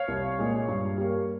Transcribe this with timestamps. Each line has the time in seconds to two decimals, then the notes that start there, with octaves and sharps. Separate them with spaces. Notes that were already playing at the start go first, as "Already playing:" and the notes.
Already playing: C#5 F5
0.08 C2
0.38 A#2 G#3
0.68 G2
0.98 G3 A#3